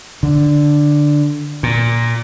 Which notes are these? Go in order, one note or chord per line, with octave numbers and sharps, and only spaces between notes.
D3
A#2